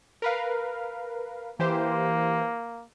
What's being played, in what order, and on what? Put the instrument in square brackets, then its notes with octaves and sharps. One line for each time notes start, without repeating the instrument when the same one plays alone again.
[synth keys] A#4 B4 F5
[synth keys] E3 G4 C5 [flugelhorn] A#3